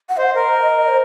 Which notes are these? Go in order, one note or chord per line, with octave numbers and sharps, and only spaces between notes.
F#5
C5 D#5
A#4
C5